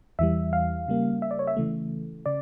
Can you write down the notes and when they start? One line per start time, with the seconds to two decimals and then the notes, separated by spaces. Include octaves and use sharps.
0.19 E2 E3 G3 E5
0.53 F5
0.88 C#3 G3 A#3
1.22 E5
1.31 D5
1.39 C#5
1.47 E5
1.57 C#3 E3 A3
2.26 C#3 D5